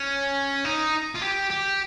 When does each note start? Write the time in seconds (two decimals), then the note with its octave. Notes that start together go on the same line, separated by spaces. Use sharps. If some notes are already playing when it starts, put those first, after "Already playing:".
Already playing: C#4
0.65 D#4
1.16 F4
1.22 G4
1.51 G4